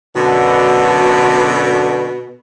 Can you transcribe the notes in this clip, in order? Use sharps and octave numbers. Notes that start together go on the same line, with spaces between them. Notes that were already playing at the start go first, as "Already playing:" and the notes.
F#2 B2 D3